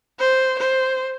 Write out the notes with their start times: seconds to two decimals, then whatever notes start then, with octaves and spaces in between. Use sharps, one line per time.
0.20 C5
0.59 C5